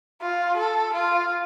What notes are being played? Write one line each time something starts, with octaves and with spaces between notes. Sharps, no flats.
F4
A4
F4